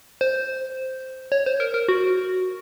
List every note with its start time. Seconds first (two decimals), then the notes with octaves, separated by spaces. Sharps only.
0.21 C5
1.32 C#5
1.46 C5
1.60 A#4
1.74 A#4
1.89 F#4